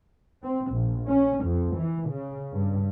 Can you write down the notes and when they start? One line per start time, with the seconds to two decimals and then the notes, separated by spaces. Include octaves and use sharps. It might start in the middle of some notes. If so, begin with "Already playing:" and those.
0.43 C4
0.73 A#1
1.08 C#4
1.44 F2
1.76 E3
2.10 C#3
2.52 G2